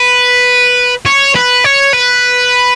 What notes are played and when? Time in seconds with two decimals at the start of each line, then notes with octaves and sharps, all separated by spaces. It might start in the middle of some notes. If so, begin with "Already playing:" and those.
Already playing: B4
1.06 C#5
1.35 B4
1.64 C#5
1.93 B4